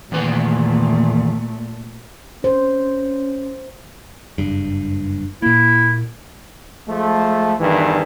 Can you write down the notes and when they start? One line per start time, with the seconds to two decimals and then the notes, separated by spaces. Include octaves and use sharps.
0.12 E2 A#2 D#3 A3 B4
2.44 C#4 C5
4.38 F#1 G2
5.42 A#2 A#3 E4
6.88 F3 G#3 A3
7.60 E2 G2 D#3 E3